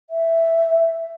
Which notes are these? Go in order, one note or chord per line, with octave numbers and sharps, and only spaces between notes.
E5